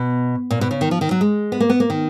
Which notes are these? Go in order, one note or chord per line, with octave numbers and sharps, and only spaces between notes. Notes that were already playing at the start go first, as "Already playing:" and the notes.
Already playing: B2
A#2
B2
C#3
D#3
F3
D#3
F#3
G#3
B3
A#3
B3
A#3
D#3